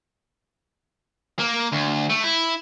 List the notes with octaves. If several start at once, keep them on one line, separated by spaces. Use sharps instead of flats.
A#3
D2
A3
E4